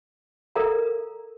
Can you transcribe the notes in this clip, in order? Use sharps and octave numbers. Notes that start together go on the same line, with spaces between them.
A4 A#4 D5 F5 A#5